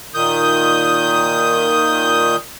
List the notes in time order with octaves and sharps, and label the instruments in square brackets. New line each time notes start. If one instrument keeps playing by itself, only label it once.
[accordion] A#2 D#3 D#6 G6